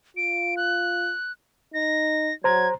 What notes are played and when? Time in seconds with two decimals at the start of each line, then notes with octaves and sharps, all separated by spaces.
0.17 F4 D7
0.57 F#6
1.74 D#4 A#6
2.44 F#3 C5 A#5 G#6